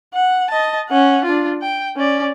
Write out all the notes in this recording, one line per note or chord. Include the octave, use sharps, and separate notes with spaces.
F#5
D#5 A5
C#4 F#5
D4 F4
G5
C#4 D5